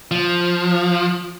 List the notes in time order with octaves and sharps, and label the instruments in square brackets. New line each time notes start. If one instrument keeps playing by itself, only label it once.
[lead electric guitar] F3